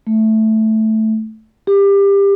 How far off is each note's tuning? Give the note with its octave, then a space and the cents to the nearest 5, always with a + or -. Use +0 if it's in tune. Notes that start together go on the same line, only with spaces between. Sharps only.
A3 +0
G4 +25